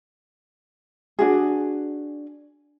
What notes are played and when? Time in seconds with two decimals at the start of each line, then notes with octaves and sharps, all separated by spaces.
1.19 D4 F#4 G#4